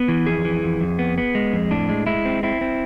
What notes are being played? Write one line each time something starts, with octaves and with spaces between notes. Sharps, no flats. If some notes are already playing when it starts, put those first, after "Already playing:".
Already playing: B3
E3
F2 G#4
E3
F2
F2
B3
B3
G#3
F2
A2 D4
G#3
G#3 E4
C4
C4 E4
C4